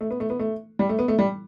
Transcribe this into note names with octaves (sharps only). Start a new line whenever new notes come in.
A3
B3
A3
B3
A3
G3
A3
B3
A3
G3